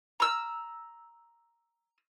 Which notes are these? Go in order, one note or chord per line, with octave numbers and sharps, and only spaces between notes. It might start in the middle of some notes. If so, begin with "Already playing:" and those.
A#5 E6